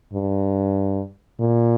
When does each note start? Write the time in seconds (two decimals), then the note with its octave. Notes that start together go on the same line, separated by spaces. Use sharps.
0.14 G2
1.40 A#2